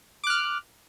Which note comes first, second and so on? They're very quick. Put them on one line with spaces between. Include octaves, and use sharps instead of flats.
D6 F#6 F6